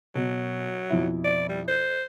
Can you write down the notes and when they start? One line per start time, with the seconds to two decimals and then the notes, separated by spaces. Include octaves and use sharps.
0.15 B2 F#3
0.90 F2 B2 E4
1.24 D5
1.49 G3
1.68 C5